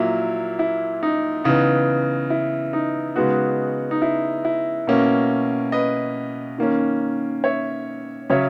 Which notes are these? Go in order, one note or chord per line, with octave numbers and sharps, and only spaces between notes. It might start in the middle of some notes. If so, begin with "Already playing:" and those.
Already playing: A#2 F#3 A#3 E4
E4
D#4
C#3 E3 B3 D#4
E4
D#4
C#3 G#3 B3 D#4 F#4
D#4
E4
E4
B2 A#3 C#4
B4 D#5
D#3 A#3 C#4
C#5 E5
C#3 F#3 C#4 C#5 E5